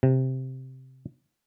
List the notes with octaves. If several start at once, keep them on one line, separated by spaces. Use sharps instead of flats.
C3